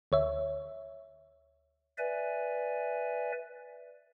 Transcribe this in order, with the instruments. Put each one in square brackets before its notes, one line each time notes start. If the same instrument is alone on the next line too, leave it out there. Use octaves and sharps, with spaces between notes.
[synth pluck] D2 C#5 E5
[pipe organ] B4 D5 E5 G#5